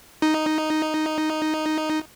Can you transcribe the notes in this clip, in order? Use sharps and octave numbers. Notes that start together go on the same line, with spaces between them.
D#4